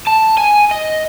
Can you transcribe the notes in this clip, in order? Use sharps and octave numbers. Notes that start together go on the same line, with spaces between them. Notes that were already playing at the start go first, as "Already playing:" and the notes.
A5
G#5
D#5